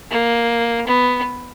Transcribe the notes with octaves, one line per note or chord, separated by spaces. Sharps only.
A#3
B3